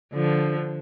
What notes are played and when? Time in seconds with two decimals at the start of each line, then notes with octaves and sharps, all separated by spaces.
0.13 D3 F3